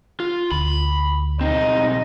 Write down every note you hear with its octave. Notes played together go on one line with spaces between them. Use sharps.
F4
D2 B5
B1 C4 D#4